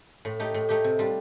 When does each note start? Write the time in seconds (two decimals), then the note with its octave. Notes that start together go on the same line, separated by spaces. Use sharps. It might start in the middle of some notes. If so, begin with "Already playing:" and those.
0.25 A2
0.40 A3 D#4 G4
0.54 A2
0.69 A3 D#4 G4
0.84 C3
0.99 G3 D4 F4